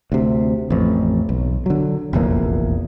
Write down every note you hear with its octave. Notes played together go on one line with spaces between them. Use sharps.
D2 C3
A1 F2
B1
D3 F#3
F1 A#1 E2 A#3